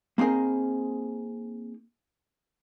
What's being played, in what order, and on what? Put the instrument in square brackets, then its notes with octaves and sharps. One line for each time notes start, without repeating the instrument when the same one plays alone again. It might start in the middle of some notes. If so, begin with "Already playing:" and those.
[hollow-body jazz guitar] A#3 C4 D#4 G#4 A#4